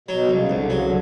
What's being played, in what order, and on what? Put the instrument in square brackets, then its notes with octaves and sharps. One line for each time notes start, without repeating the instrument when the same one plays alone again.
[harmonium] B2 [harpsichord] F#3
[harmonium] D3
[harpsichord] C2 [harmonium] C#3
[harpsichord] C2 [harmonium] D3
[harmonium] C#3
[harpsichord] F#3
[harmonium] D3